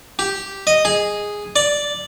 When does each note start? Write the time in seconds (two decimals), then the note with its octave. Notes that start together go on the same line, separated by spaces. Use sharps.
0.19 G4
0.67 D#5
0.85 G#4
1.56 D5